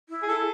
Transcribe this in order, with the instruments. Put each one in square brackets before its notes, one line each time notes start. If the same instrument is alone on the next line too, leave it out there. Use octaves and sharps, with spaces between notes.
[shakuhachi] E4
[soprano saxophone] G#4
[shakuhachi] E4 [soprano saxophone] A4